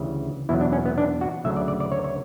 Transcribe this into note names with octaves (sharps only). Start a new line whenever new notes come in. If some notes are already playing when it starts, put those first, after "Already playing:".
Already playing: D2 C#3 E3 G3
E2 B2 F#3 E4
D4
C#4
B3
D4
F#4
D2 C#3 F#3 A3 E5
D5
D5
D5
C#5
C#5